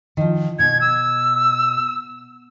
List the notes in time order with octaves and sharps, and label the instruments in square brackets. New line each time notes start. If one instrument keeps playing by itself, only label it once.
[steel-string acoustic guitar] D#3 F3
[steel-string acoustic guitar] B2 [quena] G#6
[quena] E6